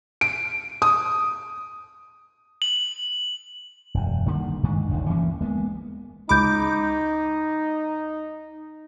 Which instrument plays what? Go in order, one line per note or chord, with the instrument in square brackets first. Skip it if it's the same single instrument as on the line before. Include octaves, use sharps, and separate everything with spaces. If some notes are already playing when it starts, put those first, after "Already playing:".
[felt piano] D7
D#6
[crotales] F#7
[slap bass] E1 F#2
D3 D#3 G3 A#3
G2 D#3 G#3 D4
D#1 C2 F2 D#3
D2 E3 A#3 C#4
G#3 A#3 B3
[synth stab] C#2 D6 [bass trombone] D#4 [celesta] B5 G6